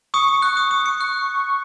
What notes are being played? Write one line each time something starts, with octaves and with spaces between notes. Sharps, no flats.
C#6 D#6
D#6
F#6
D#6
D#6
C#7
F#6